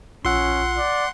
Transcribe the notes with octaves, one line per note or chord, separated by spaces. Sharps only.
A#1 C#4 F4 F#5 C6 E6
D5